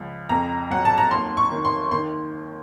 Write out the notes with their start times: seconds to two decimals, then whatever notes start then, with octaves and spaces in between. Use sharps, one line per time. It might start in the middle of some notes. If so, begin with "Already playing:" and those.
Already playing: C#2 F3
0.29 F2 A#5
0.70 F#3 F#5
0.85 A5
0.98 A#5
1.11 D#2 C6
1.37 C#6
1.51 D#3
1.65 C6
1.91 D#3 C6